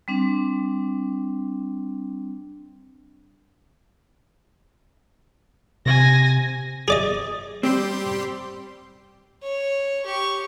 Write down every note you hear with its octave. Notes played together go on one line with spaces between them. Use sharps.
G3 C4 D4
C3 G#5 A#6
G#4 D5 D#5
G3 C4 G4 C6
C#5
G4 C#6